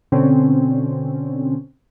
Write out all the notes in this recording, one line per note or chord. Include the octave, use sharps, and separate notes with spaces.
B2 D3 C4 C#4